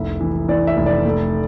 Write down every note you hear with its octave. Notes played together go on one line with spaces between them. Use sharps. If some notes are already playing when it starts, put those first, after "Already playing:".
Already playing: F1 C2 E5
E3
E3 D5
E5
F1
D5
A3